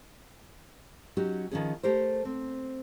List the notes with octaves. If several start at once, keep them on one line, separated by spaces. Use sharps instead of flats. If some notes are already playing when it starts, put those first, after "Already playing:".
F#3 C#4 D#4 F#4 G4
D#3 F3 C#4 G#4
A3 G4 A#4 C5
C4